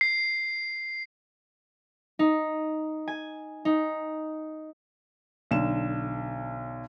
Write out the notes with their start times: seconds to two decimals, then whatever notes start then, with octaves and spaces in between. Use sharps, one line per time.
0.01 C7
2.19 D#4
3.08 G#5
3.65 D#4
5.51 B1 D3 E7